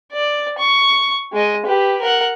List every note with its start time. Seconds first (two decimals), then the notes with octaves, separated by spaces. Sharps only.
0.12 D5
0.58 C#6
1.33 G#3 D#5
1.65 G4 B4
2.01 A#4 F#5